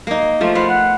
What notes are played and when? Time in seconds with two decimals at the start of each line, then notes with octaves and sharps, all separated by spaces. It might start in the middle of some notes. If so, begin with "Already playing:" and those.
0.07 A#3 D#4
0.41 F3 A3 F4
0.55 B3 C5 F5
0.69 F#5